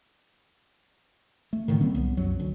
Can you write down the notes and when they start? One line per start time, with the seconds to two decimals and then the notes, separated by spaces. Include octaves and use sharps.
1.53 A3
1.68 A2 D3 D#3
1.81 G3 A#3 C4 C#4
1.95 C2 F#3 B3
2.17 C2 F#2 F#3
2.40 D2